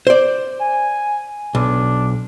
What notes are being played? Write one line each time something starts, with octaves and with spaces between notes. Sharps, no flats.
C5 D5
G#5
B1 D4